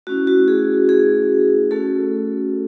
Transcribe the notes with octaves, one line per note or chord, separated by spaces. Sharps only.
A3 C#4 E4 F#4
F#4
G#4
G#4
A3 C#4 F#4 A4